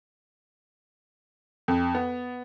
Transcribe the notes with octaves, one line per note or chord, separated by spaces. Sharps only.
F2
B3